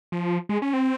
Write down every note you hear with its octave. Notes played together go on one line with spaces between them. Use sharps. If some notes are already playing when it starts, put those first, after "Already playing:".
F3
G#3
C#4
C4